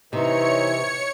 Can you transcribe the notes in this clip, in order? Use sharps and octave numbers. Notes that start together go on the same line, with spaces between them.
C3 E3 D#4 C#5 C#7